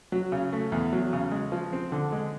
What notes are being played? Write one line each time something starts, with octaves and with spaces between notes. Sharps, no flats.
F#3
C#3
A3
E2
F#3
C#3
G#3
F3
C4
D3
G#3